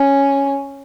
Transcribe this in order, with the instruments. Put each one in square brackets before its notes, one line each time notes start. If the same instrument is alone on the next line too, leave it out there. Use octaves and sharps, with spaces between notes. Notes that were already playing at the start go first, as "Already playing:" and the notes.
Already playing: [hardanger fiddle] C#4